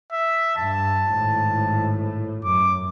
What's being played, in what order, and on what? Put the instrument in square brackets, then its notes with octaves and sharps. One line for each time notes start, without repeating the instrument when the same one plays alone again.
[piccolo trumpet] E5
[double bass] G2 [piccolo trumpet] A5
[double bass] G#1 A2
[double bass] F#2 [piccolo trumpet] D6